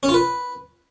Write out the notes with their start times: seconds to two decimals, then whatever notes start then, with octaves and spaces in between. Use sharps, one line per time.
0.03 C#4
0.09 F4
0.14 B4